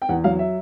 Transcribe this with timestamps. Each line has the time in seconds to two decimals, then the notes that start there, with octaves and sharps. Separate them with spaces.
0.02 G5
0.09 E2 F#5
0.24 F#3 F5
0.39 E5